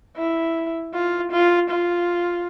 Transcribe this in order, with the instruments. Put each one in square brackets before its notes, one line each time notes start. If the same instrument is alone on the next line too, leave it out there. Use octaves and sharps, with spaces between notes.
[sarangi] E4
F4
F4
F4